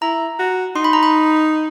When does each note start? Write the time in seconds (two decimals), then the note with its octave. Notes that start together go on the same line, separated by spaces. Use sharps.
0.02 E4 A#5
0.39 F#4
0.75 D#4 C6
0.84 B5
0.93 A#5
1.03 B5